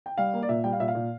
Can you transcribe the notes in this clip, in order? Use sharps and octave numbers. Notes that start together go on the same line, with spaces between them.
G5
G3 F5
A#3
D5
A#2 E5
G3 G5
F5
A#2 E5
F5
A#2